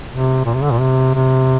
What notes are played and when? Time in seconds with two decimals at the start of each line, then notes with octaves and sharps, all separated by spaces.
0.12 C3
0.45 A#2
0.54 C3
0.63 D3
0.71 A#2
0.80 C3
1.14 C3